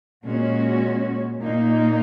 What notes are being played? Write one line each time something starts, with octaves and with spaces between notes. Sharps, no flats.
A#2 G#3 C#4 F#4
A#2 A#3 D#4